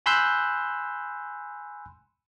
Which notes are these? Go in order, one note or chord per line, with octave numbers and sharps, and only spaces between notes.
G#5 B5 C6 E6 F#6 G6